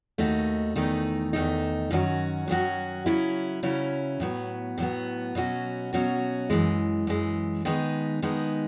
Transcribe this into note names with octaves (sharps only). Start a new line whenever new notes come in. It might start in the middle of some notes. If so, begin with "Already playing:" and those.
D#2 D#3 A3 D#4 F#4
E2 D#3 A3 D#4
E2 D#3 A3 D#4
F#2 D#3 F#3 C#4 F#4
F#2 D#3 F#3 C#4 F#4
C#3 F#3 C#4 E4
C#3 F#3 C#4 E4
A2 F#3 B3
A2 F#3 B3
B2 F#3 C#4 F#4
B2 F#3 C#4 F#4
F#2 E3 G#3
F#2 E3 G#3
D#3 G#3 B3 D#4
D#3 G#3 B3 D#4